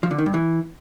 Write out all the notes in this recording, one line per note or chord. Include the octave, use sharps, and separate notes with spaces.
F3
D3
D#3
G2
E3